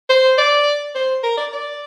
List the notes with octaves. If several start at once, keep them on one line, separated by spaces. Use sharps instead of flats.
C5
D5
C5
A#4
D5
D5